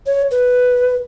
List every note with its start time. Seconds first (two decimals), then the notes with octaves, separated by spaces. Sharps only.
0.06 C#5
0.31 B4